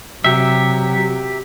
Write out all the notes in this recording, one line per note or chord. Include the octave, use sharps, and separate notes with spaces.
C3 F#3 G4 E5